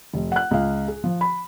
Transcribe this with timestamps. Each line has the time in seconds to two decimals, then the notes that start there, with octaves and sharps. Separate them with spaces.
0.14 F1
0.32 F#5 F#6
0.51 C#2 F5
0.88 G#4
1.04 F3
1.21 B5